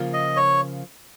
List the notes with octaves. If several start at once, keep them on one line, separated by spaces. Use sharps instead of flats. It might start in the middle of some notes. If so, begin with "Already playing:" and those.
Already playing: C#3 F3 A#3 F4
D#5
C#5